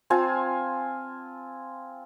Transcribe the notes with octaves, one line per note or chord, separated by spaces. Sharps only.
C4 F4 G#5 A5